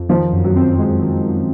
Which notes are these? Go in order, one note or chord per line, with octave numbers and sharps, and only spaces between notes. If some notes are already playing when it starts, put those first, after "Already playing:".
Already playing: F2
D#3 F3
F#2
F#3
C4
G#3
D#3
F#2